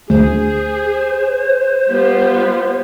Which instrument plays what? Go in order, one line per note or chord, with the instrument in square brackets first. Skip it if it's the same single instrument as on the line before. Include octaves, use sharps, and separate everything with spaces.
[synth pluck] D2 [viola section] G#4 [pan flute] C5
[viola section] G3 B3 F4